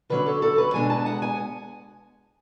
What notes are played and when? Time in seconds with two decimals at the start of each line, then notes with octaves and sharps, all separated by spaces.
0.10 D3 F#3 C#4 B4
0.26 A4
0.42 A4
0.58 B4
0.74 B2 G#3 B3 D4 G#5
0.90 A5
1.06 F#5
1.22 G#5